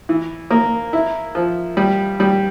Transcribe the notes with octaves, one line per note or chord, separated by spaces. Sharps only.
E3
A#3
E4
F3
G3
G3